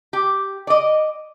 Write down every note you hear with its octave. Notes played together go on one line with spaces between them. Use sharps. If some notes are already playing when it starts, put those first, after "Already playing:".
G4
D5 D#5